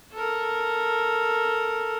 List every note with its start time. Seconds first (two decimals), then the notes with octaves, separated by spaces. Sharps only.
0.13 A4 A#4